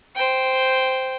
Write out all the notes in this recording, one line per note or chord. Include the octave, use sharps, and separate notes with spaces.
C5 G5